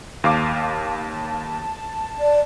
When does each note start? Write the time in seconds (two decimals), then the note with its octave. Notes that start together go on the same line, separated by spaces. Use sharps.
0.24 D#2 F5 A5 D6
2.20 D5